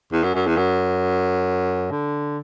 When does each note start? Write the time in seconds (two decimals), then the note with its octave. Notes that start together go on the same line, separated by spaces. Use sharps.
0.12 E2
0.24 F#2
0.35 F#2
0.47 E2
0.57 F#2
1.91 D3